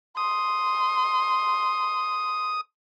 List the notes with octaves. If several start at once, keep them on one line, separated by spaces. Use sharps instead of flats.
C6 D#6